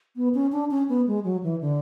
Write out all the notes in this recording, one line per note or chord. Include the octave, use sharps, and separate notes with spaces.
B3
C#4
D4
C#4
B3
G#3
F#3
E3
D3